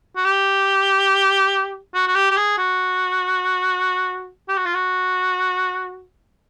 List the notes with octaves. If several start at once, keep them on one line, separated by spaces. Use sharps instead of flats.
F#4
G4
F#4
F#4
G4
G4
G#4
F#4
G4
F#4
F4
F#4